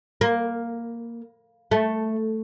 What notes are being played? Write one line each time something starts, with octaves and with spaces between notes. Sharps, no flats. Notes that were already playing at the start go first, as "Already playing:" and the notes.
A#3
A3